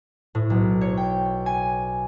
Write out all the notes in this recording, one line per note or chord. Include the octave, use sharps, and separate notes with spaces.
A2
B1
C#5
G5
G#5